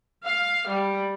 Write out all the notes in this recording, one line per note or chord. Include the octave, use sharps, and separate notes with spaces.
F5
G3